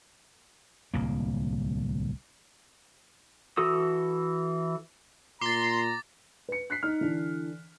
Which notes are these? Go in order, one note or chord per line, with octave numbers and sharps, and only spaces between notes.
D1 C2 A#3
E3 F#4 A4 D#6 E6
A#2 A#5 C6 D6 A6
B4 C#7
F#6 B6 C7
D#4 F6
D3 E3 D4